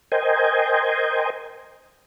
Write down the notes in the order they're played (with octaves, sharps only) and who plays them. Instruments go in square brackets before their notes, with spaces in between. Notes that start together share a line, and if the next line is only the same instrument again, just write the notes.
[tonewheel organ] A#4 C5 D#5 G5 G#5